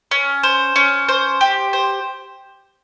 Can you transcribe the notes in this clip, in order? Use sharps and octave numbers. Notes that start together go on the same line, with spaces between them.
C#4
C5
C#4
C5
G4
C5